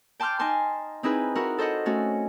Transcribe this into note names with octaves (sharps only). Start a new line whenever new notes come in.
G5 A5 C6 D6 F6 G6
D#4 G#5 A5 C6
C4 D#4 E4 G#4 B4
E4 F#4 A#4 F#5
A4 C5 D#5 F#5
A3 C#4 F#4